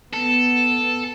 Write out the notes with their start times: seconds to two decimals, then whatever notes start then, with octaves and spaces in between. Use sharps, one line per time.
0.14 B3 A4